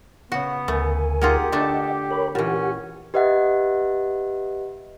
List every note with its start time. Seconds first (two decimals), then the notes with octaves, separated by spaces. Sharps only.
0.32 C#3 B3 F#4 F#5
0.68 D2 A3 A#4 G#5
1.21 A#3 D#4 F4 G4 G#4 F#5
1.52 D3 A3 D4 A4 D#5 F#5 A5
2.11 A#4 C#5 B5
2.35 A#2 E3 C#4 G4 F#5
3.14 G4 B4 D#5 E5 F#5